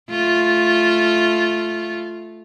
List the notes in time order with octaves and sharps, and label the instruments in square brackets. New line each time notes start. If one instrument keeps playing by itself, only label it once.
[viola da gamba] A3 F4